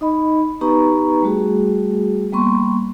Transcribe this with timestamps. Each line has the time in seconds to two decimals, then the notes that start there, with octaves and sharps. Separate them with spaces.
0.01 D#4 D#5 B5
0.61 B3 D#4 G4 B4 A#5 C#6
1.22 G3 A3 F#4 G#4
2.33 G3 A#3 B3 C6 C#6